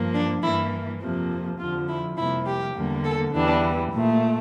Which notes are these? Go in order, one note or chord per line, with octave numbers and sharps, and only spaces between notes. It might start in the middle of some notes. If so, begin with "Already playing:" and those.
Already playing: G2 F3 A#3
D4
G2 E3 A#3 E4
F2 C3 F3 A#3
F2 D3 F3 F4
E4
F2 C3 G3 A#3 E4
G4
E2 D3 G3 A#3
A4
E2 E3 G3 D4
A#2 A3